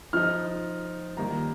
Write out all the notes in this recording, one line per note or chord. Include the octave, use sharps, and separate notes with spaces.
F3 D#4 F6
D#3 G3 A#3 A#5